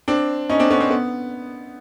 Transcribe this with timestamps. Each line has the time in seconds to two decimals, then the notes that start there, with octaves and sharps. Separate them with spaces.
0.08 C4 D4
0.50 C#4 D#4
0.59 C4 D4
0.70 B3 C#4
0.80 C4
0.91 B3